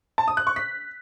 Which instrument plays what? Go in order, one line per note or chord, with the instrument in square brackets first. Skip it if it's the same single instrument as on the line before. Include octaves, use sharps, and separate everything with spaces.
[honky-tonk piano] A5
D#6
F#6
C#6
B6